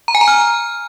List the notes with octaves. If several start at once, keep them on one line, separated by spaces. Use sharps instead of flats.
A#5
G#5
A#5
F6